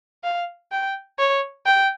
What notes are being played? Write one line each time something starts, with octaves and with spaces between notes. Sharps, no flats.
F5
G5
C#5
G5